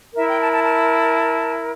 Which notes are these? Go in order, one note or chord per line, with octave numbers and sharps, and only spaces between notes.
E4 A#4 E5
G5
A5
A5
A5